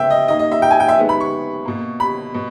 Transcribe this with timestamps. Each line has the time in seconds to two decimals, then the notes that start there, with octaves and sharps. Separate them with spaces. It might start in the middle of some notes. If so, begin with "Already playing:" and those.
Already playing: C#3 G#3 B3 E5 G5
0.10 D#5
0.28 D#3 A#3 D#5
0.39 D#5
0.52 E5
0.62 G5
0.71 G#5
0.80 G5
0.88 E5
0.97 D#3 G#3 B3
1.09 B5
1.20 C#6
1.65 B2 A#3
2.00 B5
2.34 B2